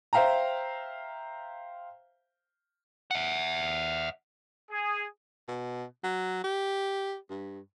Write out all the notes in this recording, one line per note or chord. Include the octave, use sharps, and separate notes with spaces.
C5 E5 F5 G5 A#5
E5 F#5
G#4
B2
F#3
G4
G2